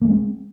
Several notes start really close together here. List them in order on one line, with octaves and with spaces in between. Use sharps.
A#3 G3 G#3 C4